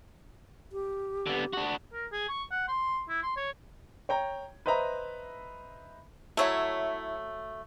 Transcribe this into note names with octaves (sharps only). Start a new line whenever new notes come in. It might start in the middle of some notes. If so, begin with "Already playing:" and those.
G4
D3 B3
D4 F#4
A#4
G#4
C#6
F#5
C6
E4
C6
C#5
C#5 G5 A#5
B4 C5 D#5 E5 A#5 B5
F#3 A3 E4 C#5 E5